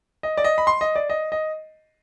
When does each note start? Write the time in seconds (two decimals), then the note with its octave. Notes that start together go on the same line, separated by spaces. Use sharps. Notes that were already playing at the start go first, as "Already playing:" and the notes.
0.23 D#5
0.37 D5
0.44 D#5
0.58 B5
0.67 C6
0.81 D#5
0.96 D5
1.10 D#5
1.32 D#5